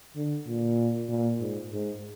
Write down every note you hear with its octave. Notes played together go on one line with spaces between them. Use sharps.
D3
A#2
A#2
G#2
G#2